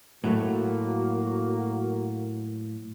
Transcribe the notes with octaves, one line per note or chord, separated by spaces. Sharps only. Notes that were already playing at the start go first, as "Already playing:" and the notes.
A2 F#3 A3 A#3 F#4